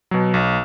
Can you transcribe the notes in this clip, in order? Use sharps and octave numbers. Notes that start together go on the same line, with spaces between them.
B2 F#3
B1